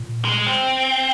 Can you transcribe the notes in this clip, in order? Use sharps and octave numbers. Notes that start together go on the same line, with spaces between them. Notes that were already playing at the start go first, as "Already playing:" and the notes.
Already playing: A#2
G#3
C4